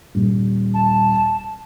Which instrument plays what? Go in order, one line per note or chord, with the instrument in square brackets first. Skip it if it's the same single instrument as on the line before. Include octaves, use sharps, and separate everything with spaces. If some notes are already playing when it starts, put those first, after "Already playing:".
[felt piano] D#1
[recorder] A5